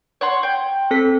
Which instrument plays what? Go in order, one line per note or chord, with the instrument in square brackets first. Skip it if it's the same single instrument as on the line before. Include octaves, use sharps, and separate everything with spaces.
[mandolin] C#5 F#5 C6
G5
[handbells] C4 A4 B6